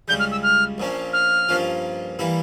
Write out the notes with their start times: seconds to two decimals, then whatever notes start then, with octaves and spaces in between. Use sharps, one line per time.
0.08 C#2 C#3 G3 G6
0.19 F6
0.31 E6
0.43 F6
0.78 A#1 A#2 F3 A#3 C#4
1.13 F6
1.49 G2 F3 A#3 C#4 F4
2.19 E3 G3 A#3 E4